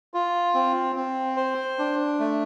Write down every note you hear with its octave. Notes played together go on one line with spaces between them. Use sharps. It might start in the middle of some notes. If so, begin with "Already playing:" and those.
F4
C4
C4
C5
D4
A3